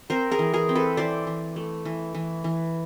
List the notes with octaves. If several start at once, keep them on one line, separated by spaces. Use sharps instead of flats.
C4 A#4 C5
G#4 A#4
E3
G#4 A#4
C4
A4 B4
E3 C5 D5
E3
A3
E3
E3
E3